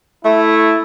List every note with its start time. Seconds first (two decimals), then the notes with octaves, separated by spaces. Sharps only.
0.25 A3 E4